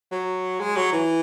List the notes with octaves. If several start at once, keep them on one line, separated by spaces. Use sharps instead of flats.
F#3
G#3
F#3
E3